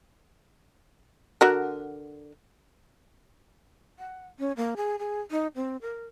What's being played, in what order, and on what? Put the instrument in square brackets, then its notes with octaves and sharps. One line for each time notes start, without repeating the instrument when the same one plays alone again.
[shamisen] D3 F#4 A#4
[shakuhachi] F#5
C#4
A#3
G#4
G#4
D#4
C4
A#4